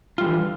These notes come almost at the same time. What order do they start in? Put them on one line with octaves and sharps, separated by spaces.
F4 G3 D3 E3